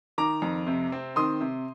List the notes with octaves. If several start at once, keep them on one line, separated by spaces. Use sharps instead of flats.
D#3 A#5 D6
F2
C3
C4
D#3 C6 D#6
C3